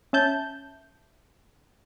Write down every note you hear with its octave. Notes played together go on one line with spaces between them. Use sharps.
C#4 E5 A5 G6